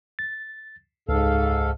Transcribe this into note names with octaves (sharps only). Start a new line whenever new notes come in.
A6
C#2 G#2 A4 F5